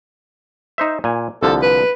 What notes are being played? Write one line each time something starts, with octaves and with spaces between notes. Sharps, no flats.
D#4 C5 E5
A#2 G#5
C2 D3 F3 A4
B4